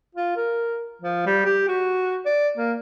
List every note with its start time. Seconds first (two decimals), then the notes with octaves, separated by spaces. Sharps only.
0.15 F4
0.36 A#4
1.02 F3
1.27 G3
1.45 G4
1.68 F#4
2.26 D5
2.57 A#3